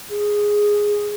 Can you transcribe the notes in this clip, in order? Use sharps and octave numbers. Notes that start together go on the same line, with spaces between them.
G#4